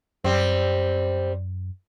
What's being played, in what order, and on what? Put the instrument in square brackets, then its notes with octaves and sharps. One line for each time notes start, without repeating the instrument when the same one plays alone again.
[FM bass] F#2 [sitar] G3 C4